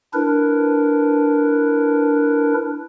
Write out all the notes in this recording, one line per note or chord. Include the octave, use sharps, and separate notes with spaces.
D4 E4 A#4 B4